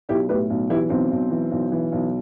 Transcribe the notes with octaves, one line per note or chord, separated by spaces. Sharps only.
B1 E4 G4
A2 G4 B4
B1
E3 E4 G4
B1 C4
B1
E3
B1
E3
B1